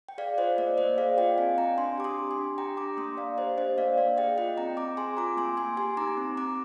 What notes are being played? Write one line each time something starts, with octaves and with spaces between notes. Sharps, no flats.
G5
G#4 D5 F5
F4 C5 D#5
A#3 D5
A#3 C5 D#5
G#4 D5 F5
F4 D#5 G5
C4 F5 G#5
C4 G5 A#5
D4 G#5 C6
G4 D6
C6 D#6
G4
G#5 C6
D4
G4 G5 A#5
D4 A#5 D6
A#3 C6 D#6
A#3 D5 F5
G4 C5 D#5
D4 C5 D#5
A#3 D5 F5
A#3 D5 F5
G#4 D#5 G5
F4 D#5 G5
C4 G5 A#5
C4 A#5 D6
G#4 G#5 C6
F4 A#5 D6
A#3 G#5 C6
A#3 G#5 C6
G4 G#5 C6
D#4 A#5 D6
C4
C4 A#5 D6